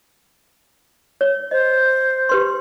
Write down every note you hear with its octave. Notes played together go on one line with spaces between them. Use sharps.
C#5
C5 D#5
G4 B4 C6